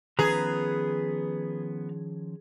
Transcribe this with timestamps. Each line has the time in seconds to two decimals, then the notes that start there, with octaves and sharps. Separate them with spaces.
0.19 D#3 F3 B3 C#4 G#4 B4 A#5